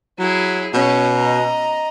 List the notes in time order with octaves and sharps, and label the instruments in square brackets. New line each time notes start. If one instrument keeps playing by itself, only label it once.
[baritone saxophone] F#3 [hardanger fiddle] E4 G#4
[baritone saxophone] B2 [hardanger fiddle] C#4
[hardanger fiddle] D#5 A#5